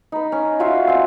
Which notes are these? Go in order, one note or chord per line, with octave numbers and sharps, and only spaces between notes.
D#4 B4
C#4
F4 F#4 C5 E5
C4 C#4 F#4